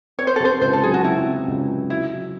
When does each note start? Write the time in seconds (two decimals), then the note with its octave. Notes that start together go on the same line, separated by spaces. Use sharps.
0.19 C4 C#5
0.27 C5
0.36 A4
0.40 C3 C5
0.61 C#2 C5
0.73 A4
0.83 F#3 G#4
0.94 F#4
1.04 C4 E4
1.26 C3
1.47 C#2
1.68 F#3
1.90 E4 F#4
2.11 F#3